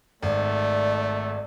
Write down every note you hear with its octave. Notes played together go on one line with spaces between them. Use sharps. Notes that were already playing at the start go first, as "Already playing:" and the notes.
G#1 A3 D5